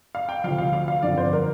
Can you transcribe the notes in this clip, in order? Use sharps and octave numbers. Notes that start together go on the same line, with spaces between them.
F5
G5
D2 C3 F3 F5
F5
F5
F5
G1 F2 D3 F3 D4 D5
C5
A#4